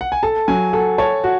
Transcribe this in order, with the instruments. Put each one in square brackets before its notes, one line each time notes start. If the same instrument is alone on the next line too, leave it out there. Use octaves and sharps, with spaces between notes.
[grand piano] F#5
G#5
[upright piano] A4 [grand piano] A5
[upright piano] F#3 [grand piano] G#5
[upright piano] A4 [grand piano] F#5
[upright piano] C#5 [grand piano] A5
[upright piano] F#4